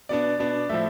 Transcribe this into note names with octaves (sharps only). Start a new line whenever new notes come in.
B2 B3 D4 D5
B2 B3 D4
A2 F3 A3 E5